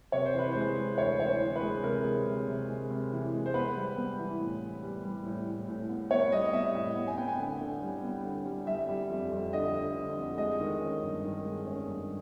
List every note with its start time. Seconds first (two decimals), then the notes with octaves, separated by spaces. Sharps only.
0.12 C3 C#5
0.26 C5
0.34 E3 B4
0.52 G#3 C5
0.77 E3
0.98 D2 C#5
1.19 E3 C#5
1.26 C5
1.41 E3
1.56 B4
1.62 G#3
1.83 C3 A#4
2.04 G#3
2.26 C3
2.48 C3
2.69 G#3
2.91 C3
3.12 E3
3.33 G#3
3.46 C5
3.54 B3 B4
3.76 G3
3.97 B3
4.19 E3
4.40 A2
4.61 B3
4.83 G3
5.04 G3
5.25 A2
5.46 A2
5.68 A2
5.89 B3
6.11 B3 C#5
6.32 G3 D#5
6.53 B3 E5
6.75 A2 E5
6.96 B3
7.07 G#5
7.18 B3 G5
7.28 G#5
7.39 D3
7.61 D3
7.82 G3
8.03 B3
8.24 D3
8.46 G3
8.67 G3 E5
8.89 G3
9.10 F2
9.32 F2
9.53 D3 D#5
9.74 D3
9.96 D3
10.17 F2
10.38 G#3 D#5
10.60 D#3
10.81 C#4
11.02 G2
11.23 D#3
11.45 G#3
11.67 C#4
11.88 G2